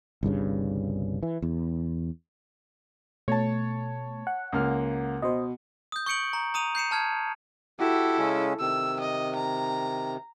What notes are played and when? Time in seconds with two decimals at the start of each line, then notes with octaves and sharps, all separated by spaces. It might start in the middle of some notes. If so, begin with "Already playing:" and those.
0.23 G1 C2 G2 C#3
1.23 E3
1.42 E2
3.28 B2 A3 C#5 A5
4.27 F#5
4.53 C#2 A#3 F6
5.22 B2 C5 D#5
5.92 D#6 G6
6.06 C#6 G6 C#7 D7 F#7
6.33 A#5
6.54 A#5 D#6 D#7 F7
6.75 G6 C7 C#7 E7
6.91 A5 F6 G#6
7.79 E4 F#4 G4 A4
8.18 C#3 G#3 C#4
8.60 C3 D#3 E6
9.00 D#5
9.36 A#5